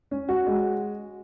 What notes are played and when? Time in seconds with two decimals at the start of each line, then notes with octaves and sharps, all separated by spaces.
0.11 C#4
0.29 F#4
0.47 G#3